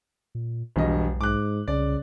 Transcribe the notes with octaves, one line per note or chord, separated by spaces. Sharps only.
A#2
E1 B1 G2 D#5
G#2 D6 F#6
C2 C#3 D5